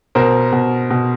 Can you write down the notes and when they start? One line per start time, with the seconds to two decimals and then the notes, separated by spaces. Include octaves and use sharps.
0.15 B2 A#4 C5
0.52 B2
0.90 B2